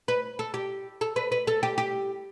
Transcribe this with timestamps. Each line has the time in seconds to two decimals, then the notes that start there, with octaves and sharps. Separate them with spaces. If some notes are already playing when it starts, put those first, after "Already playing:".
0.08 B4
0.39 A4
0.54 G4
1.01 A4
1.16 B4
1.32 B4
1.47 A4
1.63 G4
1.78 G4